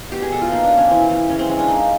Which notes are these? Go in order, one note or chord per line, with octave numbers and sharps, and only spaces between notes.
B2 G4
G#4
B2 A4
F4
A#3 D#4
D4
B2
C#4
E3 C4
E3 C#4
C#3 C#4
C4
G#3 C#4
D4
A#3 D#4